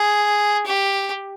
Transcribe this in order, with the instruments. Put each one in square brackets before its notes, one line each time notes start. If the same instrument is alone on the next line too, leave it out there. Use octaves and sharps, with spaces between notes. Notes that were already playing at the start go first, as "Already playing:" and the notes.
Already playing: [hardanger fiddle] G#4
G4